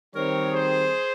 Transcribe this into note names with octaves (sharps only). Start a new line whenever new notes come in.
D#3 G3 C4 A#4 C#5
G#4 C5